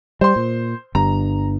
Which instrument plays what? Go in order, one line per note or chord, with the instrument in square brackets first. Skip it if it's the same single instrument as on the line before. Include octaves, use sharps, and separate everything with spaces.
[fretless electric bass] G3 [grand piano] C5 C6
[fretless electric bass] A#2
[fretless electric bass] G1 G2 [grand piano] A#5